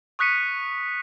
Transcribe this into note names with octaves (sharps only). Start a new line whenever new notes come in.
C#6 D#6 F#6 B6 C#7 D#7